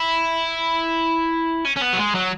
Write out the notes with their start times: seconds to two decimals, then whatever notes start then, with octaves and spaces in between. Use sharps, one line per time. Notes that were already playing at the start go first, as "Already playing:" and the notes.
Already playing: E4
1.65 C#4
1.77 C#4
1.82 B3
1.93 F#3
1.99 G#3
2.15 F#3